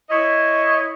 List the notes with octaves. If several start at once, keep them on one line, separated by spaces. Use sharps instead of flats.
E4 C#5 D#5